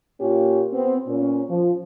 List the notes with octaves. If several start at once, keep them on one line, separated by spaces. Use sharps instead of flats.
A#2 A#3 C#4 F4 G4
B3 C4
A#2 C#4
F3